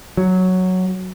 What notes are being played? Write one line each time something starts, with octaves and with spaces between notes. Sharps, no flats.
F#3